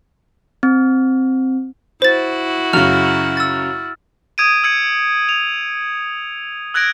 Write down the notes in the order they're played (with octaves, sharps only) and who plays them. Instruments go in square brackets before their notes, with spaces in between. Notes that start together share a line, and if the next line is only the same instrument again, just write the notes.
[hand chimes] C4
[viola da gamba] E4 F#4 [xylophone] C5 A6
[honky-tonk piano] F#2 C#3 [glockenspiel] F6 [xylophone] F7
[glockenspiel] E6 A6
[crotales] D#6 G#6 D7 D#7
E6 G#6 C#7
F7
E6 F#6 G#6 A#6 D7